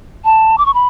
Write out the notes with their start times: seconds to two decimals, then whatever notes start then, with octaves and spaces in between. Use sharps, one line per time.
0.24 A5
0.58 D6
0.66 C#6
0.74 B5